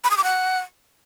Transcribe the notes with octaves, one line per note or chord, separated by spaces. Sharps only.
B5
D#6
D6
F#5